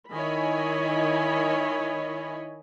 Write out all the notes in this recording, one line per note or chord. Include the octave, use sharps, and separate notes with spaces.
D#3 E4 C#5 D#5 G#5 B5